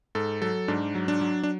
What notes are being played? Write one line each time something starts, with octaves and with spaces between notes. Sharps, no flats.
G#2 A4
F#3 A4
G#2 D4
F#3
D4
F#3
D4